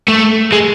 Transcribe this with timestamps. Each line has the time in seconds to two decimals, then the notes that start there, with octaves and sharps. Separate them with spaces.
0.09 A3
0.53 G#3